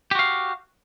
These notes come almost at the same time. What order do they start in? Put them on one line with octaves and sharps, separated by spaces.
G4 F#4 F5